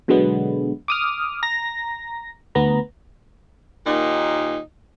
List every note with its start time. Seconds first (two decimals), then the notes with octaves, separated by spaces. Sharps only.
0.08 B2 D3 F#3 G#3 B3
0.88 D6 D#6 F6
1.43 A#5 A#6
2.55 D2 B3 A#5
3.86 D#2 A#2 D#4